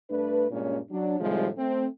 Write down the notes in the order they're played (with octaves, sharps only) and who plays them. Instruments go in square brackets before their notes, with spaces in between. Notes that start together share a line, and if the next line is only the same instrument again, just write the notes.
[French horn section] G2 A3 D4 B4
G2 A#2 G#3 C#4
F#3 D4
A2 C3 D#3 F3 G3 G#3
A3 C4